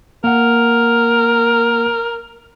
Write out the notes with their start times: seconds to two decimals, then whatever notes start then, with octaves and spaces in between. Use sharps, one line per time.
0.24 A#3 A#4 F#5